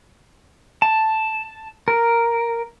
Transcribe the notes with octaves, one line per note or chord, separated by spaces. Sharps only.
A5
A#4